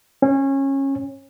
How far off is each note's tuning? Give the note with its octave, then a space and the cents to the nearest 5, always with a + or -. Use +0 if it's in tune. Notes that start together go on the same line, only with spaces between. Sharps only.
C#4 -20